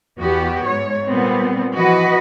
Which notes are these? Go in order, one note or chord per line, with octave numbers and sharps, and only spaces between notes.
E2 B3 F#4 G4
G#2 C#5
A#2 G3 B3 C4
E3 F3 F#4 B4 D#5